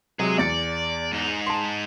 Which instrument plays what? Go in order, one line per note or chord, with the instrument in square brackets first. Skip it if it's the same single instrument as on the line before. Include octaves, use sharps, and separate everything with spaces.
[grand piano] C3 F#3 G#3 [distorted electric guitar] G#4 D#5
[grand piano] E2 A6 C#7 [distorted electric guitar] D5
[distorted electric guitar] G#2 D#4
[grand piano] A5 C6